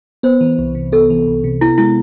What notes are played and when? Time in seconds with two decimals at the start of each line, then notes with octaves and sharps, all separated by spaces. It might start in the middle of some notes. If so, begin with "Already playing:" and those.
0.23 B3 C5
0.41 E3
0.59 C2
0.75 C3
0.92 B3 A4
1.10 E3
1.27 C2
1.44 C3
1.61 B3 E4
1.78 G#3 E4